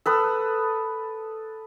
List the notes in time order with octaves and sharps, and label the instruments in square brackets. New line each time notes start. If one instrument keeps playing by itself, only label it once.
[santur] A4 B4 D#6